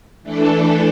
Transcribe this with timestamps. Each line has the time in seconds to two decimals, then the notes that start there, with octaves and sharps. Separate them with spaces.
0.23 E3 A3 D4 A4